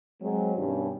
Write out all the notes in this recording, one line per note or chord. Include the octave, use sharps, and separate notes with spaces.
F#3 G#3 C4
G2 B2 D#3 C#4 G4